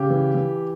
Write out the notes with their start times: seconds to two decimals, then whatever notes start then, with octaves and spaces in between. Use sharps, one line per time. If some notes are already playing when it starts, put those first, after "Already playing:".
Already playing: C#3 G4
0.10 E3
0.35 E3